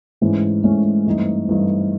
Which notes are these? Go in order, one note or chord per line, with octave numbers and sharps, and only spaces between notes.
G#2 E3 A3 C#4
G#2 E3 A3 C#4
G2 E3 A3 C4 D#4
G2 E3 A3 C4 D#4